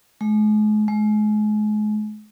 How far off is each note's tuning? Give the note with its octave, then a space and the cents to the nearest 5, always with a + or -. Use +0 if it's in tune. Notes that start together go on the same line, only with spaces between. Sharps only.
G#3 +40
G#3 +35